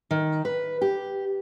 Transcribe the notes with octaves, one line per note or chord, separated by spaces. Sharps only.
D#3
B4
G4